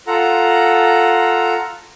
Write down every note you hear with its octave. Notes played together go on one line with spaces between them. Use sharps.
F4 A4 F#5 A#5